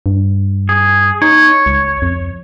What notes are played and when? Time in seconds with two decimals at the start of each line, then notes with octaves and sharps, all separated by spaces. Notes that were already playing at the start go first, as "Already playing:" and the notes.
0.06 G2
0.69 G#4
1.22 D#4 C#5
1.66 C#2
2.02 F2